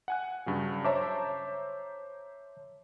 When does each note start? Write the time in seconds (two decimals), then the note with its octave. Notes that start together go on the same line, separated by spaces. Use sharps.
0.08 F#5 G#5 F#6
0.46 G2 C#3 F#3
0.84 C5 C#5 E5 A5 A#5 D6